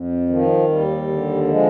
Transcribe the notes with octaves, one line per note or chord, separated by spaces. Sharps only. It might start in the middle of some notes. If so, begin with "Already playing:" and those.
Already playing: F2
D#3 F3
D#2 G3
D3
F3 G#3